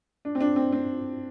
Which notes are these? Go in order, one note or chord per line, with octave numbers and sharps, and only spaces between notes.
D4
C4
D4
C4
C4